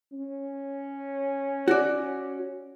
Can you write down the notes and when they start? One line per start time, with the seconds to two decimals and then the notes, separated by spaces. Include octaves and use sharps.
0.12 C#4
1.68 F#4 D5